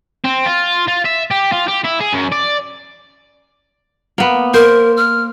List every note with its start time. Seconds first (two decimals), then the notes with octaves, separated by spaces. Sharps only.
0.25 C4
0.46 F4
0.87 F4
1.05 E5
1.31 G4
1.52 F4
1.68 G4
1.84 E4
2.00 G#4
2.13 F#2
2.32 D5
4.18 A#3 B3
4.54 A#4 C5
4.97 F6